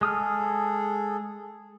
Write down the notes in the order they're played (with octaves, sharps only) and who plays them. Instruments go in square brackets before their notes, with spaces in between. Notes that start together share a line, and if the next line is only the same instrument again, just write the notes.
[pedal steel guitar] G#3 D#6 F6 [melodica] G#4 A4